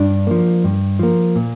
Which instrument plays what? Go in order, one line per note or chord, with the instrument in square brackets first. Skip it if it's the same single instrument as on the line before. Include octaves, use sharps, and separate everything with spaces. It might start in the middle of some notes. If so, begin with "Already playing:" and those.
Already playing: [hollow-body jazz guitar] G2 D4
F3 A#3
G2
F3 A#3
A#2